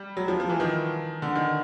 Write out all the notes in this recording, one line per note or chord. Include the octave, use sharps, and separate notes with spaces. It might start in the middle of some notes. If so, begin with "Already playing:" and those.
Already playing: G3
F#3
F3
F3
E3
D#3
D3
D#3